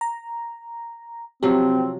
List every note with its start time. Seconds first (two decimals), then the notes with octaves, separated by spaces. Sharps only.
0.01 A#5
1.43 C3 F3 F#3 C4 G4